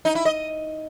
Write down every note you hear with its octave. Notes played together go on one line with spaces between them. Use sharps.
D#4
E4
D#5